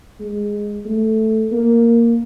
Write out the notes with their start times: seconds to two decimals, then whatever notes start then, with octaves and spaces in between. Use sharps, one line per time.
0.20 G#3
0.86 A3
1.51 A#3